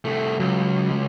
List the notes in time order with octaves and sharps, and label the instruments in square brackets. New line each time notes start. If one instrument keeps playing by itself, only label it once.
[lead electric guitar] C2 A3
[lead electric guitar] C#2 [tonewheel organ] F#3